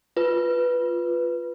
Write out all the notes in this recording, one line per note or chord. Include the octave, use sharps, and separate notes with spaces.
F4 B4